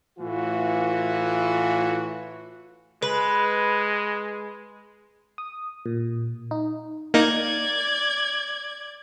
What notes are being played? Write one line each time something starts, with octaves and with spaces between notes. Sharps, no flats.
A2 E3 F4 F#4
G#3 B4
D#6
A#2
D#4
A#3 D#4 D5 G#6